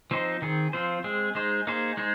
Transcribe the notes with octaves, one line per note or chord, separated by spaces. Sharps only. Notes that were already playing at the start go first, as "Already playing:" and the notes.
F3 C4 D#4 C5
D#3 C4 G#4
F3 C4 F4 C5
G#3 C4 G#4
G#3 D#4 G#4 C5
A#3 D#4 G#4 C5
G#3 D#4 G#4 C5